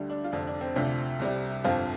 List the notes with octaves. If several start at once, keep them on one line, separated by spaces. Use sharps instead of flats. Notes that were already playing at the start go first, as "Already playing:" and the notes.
Already playing: D2 D3 G3
D4
F4
F1 F2 D3 D4
D4
C4
D2 C3 F3 D4
C2 C3 G3
G1 F2 F3 C4 F4